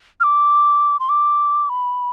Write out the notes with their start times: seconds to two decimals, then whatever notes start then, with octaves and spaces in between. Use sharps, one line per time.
0.20 F6
0.24 D6
1.00 C6
1.09 D6
1.69 B5